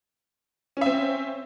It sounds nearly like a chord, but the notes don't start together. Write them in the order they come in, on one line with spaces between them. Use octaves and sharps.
C#4 E5 C4